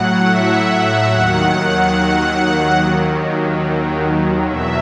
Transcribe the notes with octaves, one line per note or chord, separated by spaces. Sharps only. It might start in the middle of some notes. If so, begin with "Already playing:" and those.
Already playing: A2 F#3 F#5
E5
D#2 D#3 F#3 F#5
D#2 D#3 F#3
E2 B2 F#3 E5